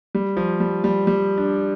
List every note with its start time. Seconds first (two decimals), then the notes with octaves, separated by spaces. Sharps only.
0.15 G3
0.37 F3
0.60 G3
0.84 G3
1.07 G3
1.38 D4